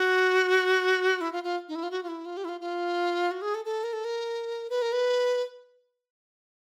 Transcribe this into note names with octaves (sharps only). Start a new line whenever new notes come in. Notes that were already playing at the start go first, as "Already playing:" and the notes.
Already playing: F#4
E4
F4
F4
D#4
E4
F4
F#4
F4
E4
F4
G4
E4
F4
F4
F#4
G#4
A4
A4
A#4
A4
A#4
B4
A#4
B4